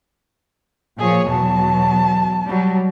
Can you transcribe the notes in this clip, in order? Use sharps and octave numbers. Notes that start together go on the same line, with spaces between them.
A#2 F3 G#4 C#5
E2 B2 F#3 A5
F#3 G3